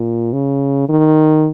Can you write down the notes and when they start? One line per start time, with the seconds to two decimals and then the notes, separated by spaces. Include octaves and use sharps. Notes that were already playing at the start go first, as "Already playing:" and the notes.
Already playing: A#2
0.33 C#3
0.89 D#3